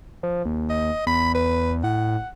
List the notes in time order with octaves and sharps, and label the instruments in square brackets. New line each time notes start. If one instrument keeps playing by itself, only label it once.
[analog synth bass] F3
D#2
[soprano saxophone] D#5
[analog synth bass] E2 [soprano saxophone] B5
[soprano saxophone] B4
[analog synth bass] A2 [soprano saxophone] F#5